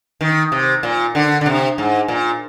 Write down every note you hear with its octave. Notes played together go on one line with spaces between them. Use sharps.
D#3
C3
A#2
D3
D3
C3
G#2
A#2